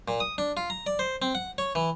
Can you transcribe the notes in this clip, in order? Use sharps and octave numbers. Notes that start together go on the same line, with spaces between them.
A#2
D#6
D4
F4
A#5
D5
C5
C4
F#5
C#5
E3